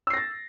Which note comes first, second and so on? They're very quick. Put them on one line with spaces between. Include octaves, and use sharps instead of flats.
E6 C7 A#6 A6